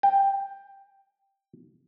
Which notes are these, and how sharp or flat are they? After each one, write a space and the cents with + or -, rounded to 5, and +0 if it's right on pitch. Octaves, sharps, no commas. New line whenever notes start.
G5 +10